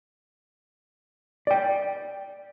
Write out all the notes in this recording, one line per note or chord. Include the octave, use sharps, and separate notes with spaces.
D5 G5